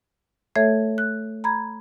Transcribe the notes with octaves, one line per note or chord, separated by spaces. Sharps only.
A3 A4 C#5 E5 G#6
F#6
A#5 B5 G#6